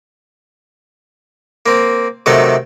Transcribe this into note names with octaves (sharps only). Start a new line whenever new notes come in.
A#3 C4
C3 D#3 F#3 A3 A4